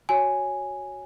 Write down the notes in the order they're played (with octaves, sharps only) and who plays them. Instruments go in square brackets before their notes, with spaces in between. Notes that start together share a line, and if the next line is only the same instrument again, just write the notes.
[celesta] F#4 C#5 G#5